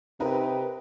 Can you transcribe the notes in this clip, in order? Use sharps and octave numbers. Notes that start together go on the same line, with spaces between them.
C3 D#4 A#4 B4